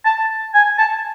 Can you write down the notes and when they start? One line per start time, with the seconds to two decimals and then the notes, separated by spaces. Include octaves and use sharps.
0.05 A5
0.54 G#5
0.78 A5